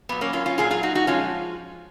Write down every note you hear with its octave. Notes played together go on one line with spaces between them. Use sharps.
A#2 F#3 B3
A#3 C#4
C#4 F4
C#4 F4
A#2 F#3 F4 G#4
F4 G#4
D#4 F#4
D#4 F#4
F3 G#3 C#4 F4